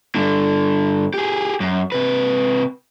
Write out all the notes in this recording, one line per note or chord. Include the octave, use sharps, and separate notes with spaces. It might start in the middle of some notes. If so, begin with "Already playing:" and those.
G2 D3
G4 G#4
F#2
C3 B4